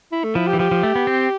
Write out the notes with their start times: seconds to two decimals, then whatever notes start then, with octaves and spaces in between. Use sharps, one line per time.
0.12 E4
0.24 A3
0.35 F3 E4
0.47 G4
0.53 E3
0.59 F3 G4
0.71 F3
0.83 A3
0.95 B3
1.07 C4